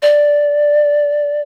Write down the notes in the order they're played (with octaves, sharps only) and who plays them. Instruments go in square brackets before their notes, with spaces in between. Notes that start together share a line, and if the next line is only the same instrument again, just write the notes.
[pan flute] D5